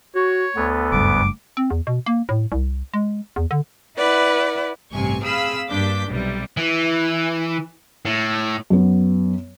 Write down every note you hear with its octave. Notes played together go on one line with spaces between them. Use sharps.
F#4 C#5
D2 B3 A4
F#1 G2 D6
C4
E2
B2
A#3
A2
C2
G#3
E2
D3
E4 B4 D5 F#5
A1 G2 C3 G#5 C#6
C4 G#4 F5 B5 E6
G2 A#3 D4 D6 G6 B6
B1 C3 G3
E3
A2
F#2 B3